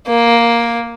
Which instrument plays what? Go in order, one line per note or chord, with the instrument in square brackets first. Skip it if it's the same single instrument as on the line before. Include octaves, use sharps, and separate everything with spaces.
[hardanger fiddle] A#3